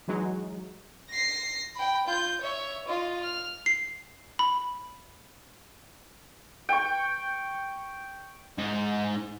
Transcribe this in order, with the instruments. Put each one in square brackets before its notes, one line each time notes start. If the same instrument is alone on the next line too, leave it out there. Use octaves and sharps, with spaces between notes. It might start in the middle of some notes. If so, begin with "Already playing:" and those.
[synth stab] E3 F#3 G#3 D#4
[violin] A#6 C7
G5 B5
F4 G6
C#5 E5
F4 D#5
F6
[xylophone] C7
B5
[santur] G5 C#6
[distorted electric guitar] G#2 D#4